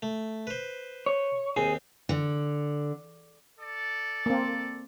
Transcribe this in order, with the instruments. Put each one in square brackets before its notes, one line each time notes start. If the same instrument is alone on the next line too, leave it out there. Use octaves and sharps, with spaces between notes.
[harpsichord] A3
B4 C5
[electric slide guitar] C#5
[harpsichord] D#2 C4 [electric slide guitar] G#4
[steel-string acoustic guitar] D3
[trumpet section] A4 D5
[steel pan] A#3 C4